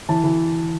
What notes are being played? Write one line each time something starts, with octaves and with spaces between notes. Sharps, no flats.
E3 A5
E3